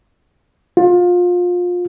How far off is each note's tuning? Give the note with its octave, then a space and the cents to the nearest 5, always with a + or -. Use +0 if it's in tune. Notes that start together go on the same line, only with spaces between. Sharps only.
F4 +25